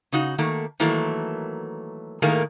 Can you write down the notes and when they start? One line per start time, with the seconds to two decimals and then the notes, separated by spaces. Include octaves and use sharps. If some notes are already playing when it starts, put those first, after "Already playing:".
0.12 C#3 D#4 F#4
0.38 D#3 A3 A#3
0.80 D#3 E3 F#3 A3 A#3
2.22 A2 D#3 A3 A#3 G#4 A#4